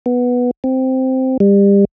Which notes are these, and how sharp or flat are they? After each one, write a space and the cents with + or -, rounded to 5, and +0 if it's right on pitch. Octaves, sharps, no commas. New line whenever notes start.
B3 -5
C4 -5
G3 +30